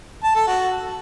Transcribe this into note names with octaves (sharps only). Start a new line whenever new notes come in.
A5
A4
F#4